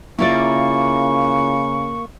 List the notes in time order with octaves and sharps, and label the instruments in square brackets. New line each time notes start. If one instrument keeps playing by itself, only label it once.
[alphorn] C#3 [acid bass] A#3 [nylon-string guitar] E4 F4 D5 [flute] C#6